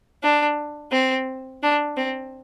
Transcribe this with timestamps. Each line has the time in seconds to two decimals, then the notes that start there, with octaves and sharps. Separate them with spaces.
0.22 D4
0.91 C4
1.62 D4
1.96 C4